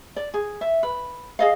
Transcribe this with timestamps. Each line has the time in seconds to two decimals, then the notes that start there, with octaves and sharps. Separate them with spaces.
0.16 D5
0.34 G#4
0.61 E5
0.83 B4
1.39 G#4 D#5 F5